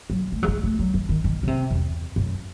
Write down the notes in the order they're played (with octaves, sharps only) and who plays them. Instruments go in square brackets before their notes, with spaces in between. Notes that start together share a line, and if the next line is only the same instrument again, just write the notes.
[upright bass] F#3
A3
F#3
G#3
A3
F#3
E3
D#3
D#3
C#3
C3
E2
F#2